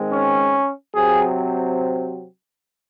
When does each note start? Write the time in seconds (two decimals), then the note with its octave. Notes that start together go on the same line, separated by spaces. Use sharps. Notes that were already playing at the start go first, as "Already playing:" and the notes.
Already playing: D#3 G#3 C4
0.13 C#4
0.95 C3 F#3 C4 G#4